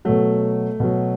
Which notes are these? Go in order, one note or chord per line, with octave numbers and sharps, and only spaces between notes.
B2 F#3 A3
B2 F#3